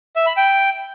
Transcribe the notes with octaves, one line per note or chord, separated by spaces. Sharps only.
E5
B5
G5